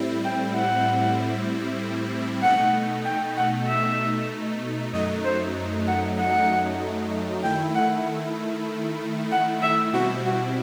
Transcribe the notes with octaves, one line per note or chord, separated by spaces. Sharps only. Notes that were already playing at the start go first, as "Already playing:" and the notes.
Already playing: A2 G3 C4 E4
G5
F#5
B2 A3 D#4 F#5
G5
F#5
E5
F#2 F#3 A3 D#4 D#5
C5
F#5
F#5
D#3 A3 E4 G5
F#5
F#5
E5
B2 G3 C4 E4 F#4
F#4